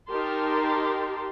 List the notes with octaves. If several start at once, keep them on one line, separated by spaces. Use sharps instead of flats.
D#4 G4 A#4 A5 C6